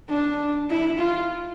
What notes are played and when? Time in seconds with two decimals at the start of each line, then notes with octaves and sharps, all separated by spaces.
0.09 D4
0.70 E4
0.99 F4